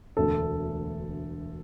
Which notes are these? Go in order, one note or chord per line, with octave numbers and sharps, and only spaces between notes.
E1 D2 D3 A4